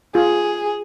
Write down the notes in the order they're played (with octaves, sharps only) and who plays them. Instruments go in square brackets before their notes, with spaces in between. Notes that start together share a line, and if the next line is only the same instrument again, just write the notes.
[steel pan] F4 [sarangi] G#4